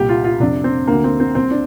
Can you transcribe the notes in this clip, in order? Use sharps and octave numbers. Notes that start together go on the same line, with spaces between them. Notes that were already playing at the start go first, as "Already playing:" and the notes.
Already playing: C2 A#2 G4
F4
F4
F2 C3 D4
C4
D2 D3 A#3
C4
C4
C2 C3 C4
D4